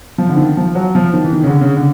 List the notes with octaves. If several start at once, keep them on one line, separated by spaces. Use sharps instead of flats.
F3
D3
D#3
F3
F#3
F3
D#3
E3
D#3
C#3
D3
C#3
D3